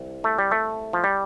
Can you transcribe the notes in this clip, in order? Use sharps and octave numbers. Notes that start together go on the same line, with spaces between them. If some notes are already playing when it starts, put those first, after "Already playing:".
Already playing: C2
A3
G3
A3
F3
G3